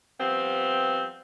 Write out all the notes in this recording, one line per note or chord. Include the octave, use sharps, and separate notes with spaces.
F3 G3 B3 C4